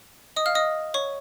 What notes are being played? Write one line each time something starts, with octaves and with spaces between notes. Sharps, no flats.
D#5 D#6
F5 F6
D#5 D#6
C#5 C#6